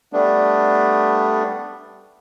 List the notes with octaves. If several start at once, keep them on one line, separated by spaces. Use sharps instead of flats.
G3 A3 B3 D4